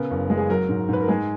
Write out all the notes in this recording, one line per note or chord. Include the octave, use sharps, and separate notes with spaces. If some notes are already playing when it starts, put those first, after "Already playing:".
Already playing: C#3 B3 A#4
F#1
G#3
G#4
F#3 A#4
G#2
G#2 B4
A#4
G#3 G#4